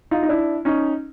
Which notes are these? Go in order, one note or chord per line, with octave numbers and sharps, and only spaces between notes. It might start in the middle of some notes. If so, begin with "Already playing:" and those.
D#4 F4
D#4
D4 E4
C#4 D#4